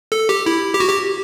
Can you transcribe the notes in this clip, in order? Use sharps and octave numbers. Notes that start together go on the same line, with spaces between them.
A4
G4
E4
G4
F#4
G4